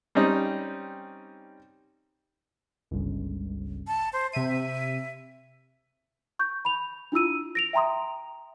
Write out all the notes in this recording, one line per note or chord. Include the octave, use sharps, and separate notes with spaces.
G3 C4 C#4 D#4
G1 C#2
A5
C5
C3 E5 D#7
C#6 G6
B5 F7
D4 E4 F4 E6 D#7
A#6 D7 F7
E5 G5 A#5 C6 D#6